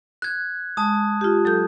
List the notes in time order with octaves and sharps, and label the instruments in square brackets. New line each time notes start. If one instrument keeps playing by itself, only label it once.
[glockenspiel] F#6 G#6
[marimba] G#3 [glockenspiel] A5 D#6
[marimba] F4 G4
F#3 A4 G6